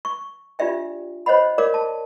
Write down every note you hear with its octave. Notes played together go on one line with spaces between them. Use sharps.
C#6
D4 F4 G4 D5 E5 G5
C5 C#5 D#5 F#5 B5
A#4 C#5 D5 F5 D6
A5